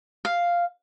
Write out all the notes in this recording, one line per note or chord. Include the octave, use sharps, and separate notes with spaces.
F5